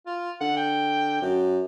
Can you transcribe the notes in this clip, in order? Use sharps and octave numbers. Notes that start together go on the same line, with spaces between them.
F4
D3 F#5
G5
F#2